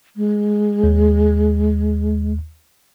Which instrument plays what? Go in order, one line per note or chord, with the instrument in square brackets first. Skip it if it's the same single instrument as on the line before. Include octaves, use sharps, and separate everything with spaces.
[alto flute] G#3
[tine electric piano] D#2